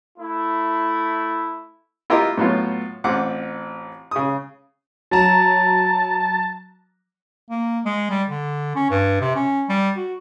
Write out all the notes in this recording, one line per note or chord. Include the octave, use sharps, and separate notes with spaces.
A3 E4
E4 F4 G4 A#4 D#5
A2 F#3 B3 F4
A1 C4 F4 F#5 D6
C#3 D#6
F#3 A5 A#5
A#3
G#3
G3
D3
C#4
G2
C3
C#4
G3
F#4